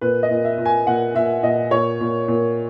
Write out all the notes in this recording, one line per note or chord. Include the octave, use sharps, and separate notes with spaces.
A#2 B4
D#5
A#2
E5
A#2
G#5
A#2 F#5
A#2 E5
A#2 D#5
A#2 C#5
A#2
A#2